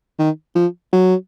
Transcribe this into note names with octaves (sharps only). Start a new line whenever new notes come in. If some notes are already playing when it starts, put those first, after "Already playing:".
D#3
F3
F#3